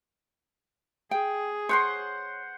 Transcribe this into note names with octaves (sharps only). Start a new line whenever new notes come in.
G#4 G5
C5 C#5 F#5 C6